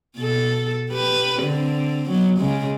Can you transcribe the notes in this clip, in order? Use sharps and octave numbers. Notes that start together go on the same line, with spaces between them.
B2 A4
G4 B4
D3 C4
F#3 B3
C#3 G#3